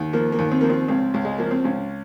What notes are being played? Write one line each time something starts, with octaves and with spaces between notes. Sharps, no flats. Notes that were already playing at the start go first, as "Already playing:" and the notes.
Already playing: D#2
F3 A#3
A#3
D#2
C4
F3 A#3
C4
C#2 C4
C#2
G#3
F3 A#3
C4
C#2 C#4